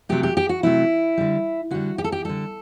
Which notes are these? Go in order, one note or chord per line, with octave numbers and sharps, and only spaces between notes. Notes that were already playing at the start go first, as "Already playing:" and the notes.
C3 F#3 A3 G4
G4
G4
F#4
C3 F#3 A3 E4
D3 G3
D3 G3 F#4
G4
A4
G4
D3 G3 A4